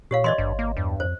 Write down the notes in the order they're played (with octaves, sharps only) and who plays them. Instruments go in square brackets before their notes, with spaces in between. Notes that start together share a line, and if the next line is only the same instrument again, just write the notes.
[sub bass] A#2 [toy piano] G4 C#5 F5
[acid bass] E3 [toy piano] D5 D#5 C6
[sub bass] G#1 [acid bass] G2
[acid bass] A#3
[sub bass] E2 [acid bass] G2
[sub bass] F2 [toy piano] C5